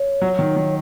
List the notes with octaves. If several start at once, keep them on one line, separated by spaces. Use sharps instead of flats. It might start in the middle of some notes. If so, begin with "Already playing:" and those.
Already playing: C#5
F#3
D#3
D#3